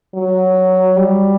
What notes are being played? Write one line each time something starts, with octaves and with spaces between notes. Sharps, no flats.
F#3
G3